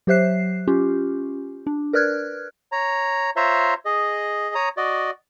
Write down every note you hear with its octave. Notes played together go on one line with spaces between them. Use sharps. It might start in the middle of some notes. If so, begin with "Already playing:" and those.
F#3 G4 C5 E5 F#6 C7
C#4 F4 G4
D4
A#4 B4 D5 F6 F#6 G#6
C#5 A#5
F4 C5 C#5 E5 A#5 C6
G#4 D#5
C#5 A#5 D#6
F#4 D5 D#5